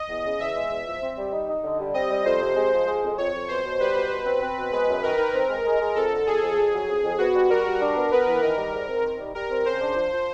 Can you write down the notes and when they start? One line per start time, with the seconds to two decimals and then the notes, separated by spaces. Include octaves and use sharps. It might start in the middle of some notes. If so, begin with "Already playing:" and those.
Already playing: D#5
0.09 E2
0.25 C#3
0.40 E2 E5
0.55 G#3
0.71 E2
0.86 F3
1.02 C4
1.17 G3
1.33 D#4
1.48 D#4
1.64 D3
1.79 G3
1.94 C4 D#5
2.10 G3
2.25 F2 C5
2.40 C3
2.56 G#3
2.72 F3
2.87 G#3
3.02 F2
3.18 F2 C#5
3.33 F2
3.48 B2 C5
3.64 B2
3.79 G3 B4
3.95 B2
4.10 B2
4.26 C4
4.41 C4
4.57 B2
4.72 G#3 B4
4.87 F#2
5.03 D#3 A#4
5.18 D#3
5.34 C4
5.49 G#3
5.65 G#3
5.80 G#3
5.95 F2 A4
6.11 D3
6.26 F2 G#4
6.42 F2
6.58 F2
6.73 F#3
6.88 F2
7.03 F2
7.18 B3 F#4
7.34 G3
7.50 G3 A#4
7.65 G3
7.81 D4
7.96 B3
8.11 B3 B4
8.27 E3
8.42 D#3 A#4
8.58 G3
8.73 G#2
8.89 C4
9.04 D#3
9.19 G3
9.35 G3 A#4
9.51 C4
9.66 C#3 C5
9.81 D4
9.96 F3
10.12 F3